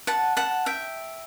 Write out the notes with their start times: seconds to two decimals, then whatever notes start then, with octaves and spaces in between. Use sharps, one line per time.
0.07 F#5 A5
0.37 F#5 A5
0.66 E5 G5